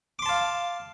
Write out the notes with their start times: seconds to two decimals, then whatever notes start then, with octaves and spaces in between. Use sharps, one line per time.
0.19 D6
0.22 C6
0.26 A5
0.29 F5